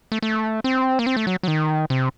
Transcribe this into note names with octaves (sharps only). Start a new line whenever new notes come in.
A3
A3
C4
A#3
C4
A3
F#3
F#3
D#3
C3